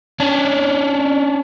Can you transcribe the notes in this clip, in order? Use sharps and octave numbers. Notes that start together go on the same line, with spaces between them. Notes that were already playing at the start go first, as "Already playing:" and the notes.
C#4 D4